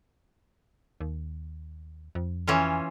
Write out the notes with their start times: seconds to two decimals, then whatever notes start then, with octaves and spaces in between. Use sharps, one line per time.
1.01 D#2
2.15 F2
2.47 E3 C#4 F4